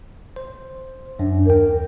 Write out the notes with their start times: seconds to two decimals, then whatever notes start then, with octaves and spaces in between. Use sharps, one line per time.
0.36 C5
1.19 F#2 D4
1.46 D#2 A#4 G5